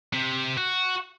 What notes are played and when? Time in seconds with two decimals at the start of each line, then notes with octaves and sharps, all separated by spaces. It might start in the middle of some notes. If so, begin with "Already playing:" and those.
0.13 C3
0.58 F#4